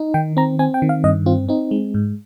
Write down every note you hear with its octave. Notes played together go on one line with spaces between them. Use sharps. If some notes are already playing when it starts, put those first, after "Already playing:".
Already playing: D#4
D#3 G5
C4 A#5
C4 G#5
G5
D#3
F5
G2 D#5
C4 F4
C4 D#4
G#3
G#2